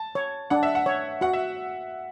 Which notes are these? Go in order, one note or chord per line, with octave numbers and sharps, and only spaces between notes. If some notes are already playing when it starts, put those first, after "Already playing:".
Already playing: A5
C#5
D4 F#5
E5
F#5
C#5
F#4 F#5
E5